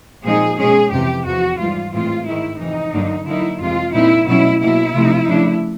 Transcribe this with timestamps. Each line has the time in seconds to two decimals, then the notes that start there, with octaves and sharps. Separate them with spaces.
0.24 A#2 F3 G#3 C4 D#4 G#4
0.58 B2 G#3 C#4 G#4
0.92 F2 C3 E3 G4
1.26 E2 C3 F3 F#4
1.59 G#2 E3 G3 F4
1.93 A2 E3 G#3 C4 F4
2.26 G#2 D#3 G#3 E4
2.59 F2 C3 E3 D#4
2.93 G2 D3 F#3 A#3 D4
3.27 D3 F#3 A#3 D#4 E4
3.60 F2 C3 E3 G#3 F4
3.93 A#2 G3 C4 D#4 E4
4.27 B2 F#3 A3 C#4 E4
4.61 B2 F#3 A#3 E4
4.94 C3 F3 A3
5.28 C#3 F3 A3 D4